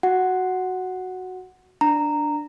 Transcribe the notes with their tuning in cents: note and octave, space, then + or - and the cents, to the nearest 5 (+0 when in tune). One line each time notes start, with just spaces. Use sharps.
F#4 +0 F#5 +0
D4 +0 A#5 -10